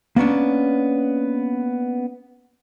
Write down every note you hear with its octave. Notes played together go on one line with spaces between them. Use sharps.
A#3 B3 C#4 D4